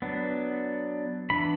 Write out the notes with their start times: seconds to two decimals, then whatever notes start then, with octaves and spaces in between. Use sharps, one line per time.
0.02 F#3 B3 D4
1.30 E3 B3 D4 B5